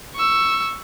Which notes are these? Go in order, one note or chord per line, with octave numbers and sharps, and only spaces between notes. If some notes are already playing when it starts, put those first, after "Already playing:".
C#6 E6